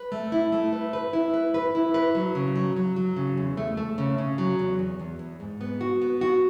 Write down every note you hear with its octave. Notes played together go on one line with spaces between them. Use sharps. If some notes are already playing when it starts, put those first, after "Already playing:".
Already playing: B4
A3
E4
A3
B4
B4
E4
B4
B4
E4
B4
F#3
C#3
F#3
F#3
F#3
C#3
E2
A3
A3
C#3
C#3
F#3
E2
E2
E2
E2
G#2
B3
F#4
B3
F#4